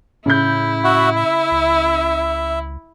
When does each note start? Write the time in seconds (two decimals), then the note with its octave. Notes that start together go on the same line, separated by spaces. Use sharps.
0.26 A2 C#3 E4 G6
0.84 F#4 E5 F#5
1.16 E5
1.51 C#2